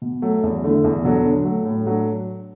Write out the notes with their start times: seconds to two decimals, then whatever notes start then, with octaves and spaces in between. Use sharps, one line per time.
0.02 B2
0.22 F#3 A3
0.44 E2
0.64 D3 A3 E4
0.84 E2
1.04 B2 F#3 D4 A4
1.25 D3
1.45 F#3 A3
1.65 A2
1.86 F#3 A3 D4